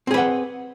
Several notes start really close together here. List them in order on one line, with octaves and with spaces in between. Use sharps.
C4 G#4 B4 F#5